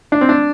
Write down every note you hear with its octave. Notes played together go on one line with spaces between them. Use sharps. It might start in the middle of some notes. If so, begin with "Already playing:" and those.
D4
C4
D4